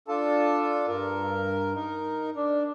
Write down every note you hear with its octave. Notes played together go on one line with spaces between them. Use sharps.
D4 F4 A4 A5
G2 A#4
D#4 A#4
D4